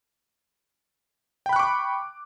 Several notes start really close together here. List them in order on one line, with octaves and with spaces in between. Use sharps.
G5 B5 F#6 C#6 D6